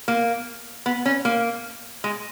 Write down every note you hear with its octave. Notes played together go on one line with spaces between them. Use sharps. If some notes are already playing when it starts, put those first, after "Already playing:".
A#3
B3
C#4
A#3
G#3